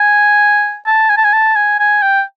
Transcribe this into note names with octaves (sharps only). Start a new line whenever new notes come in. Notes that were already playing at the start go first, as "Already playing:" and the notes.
Already playing: G#5
A5
G#5
A5
G#5
A5
G#5
G#5
G5